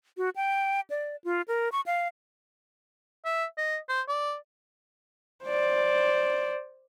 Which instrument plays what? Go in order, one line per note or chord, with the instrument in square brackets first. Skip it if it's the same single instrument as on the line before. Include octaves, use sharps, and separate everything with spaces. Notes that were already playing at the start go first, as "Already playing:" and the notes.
[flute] F#4
G5
D5
F4
A#4
C#6
F5
[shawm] E5
D#5
C5
D5
[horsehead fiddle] C5 D5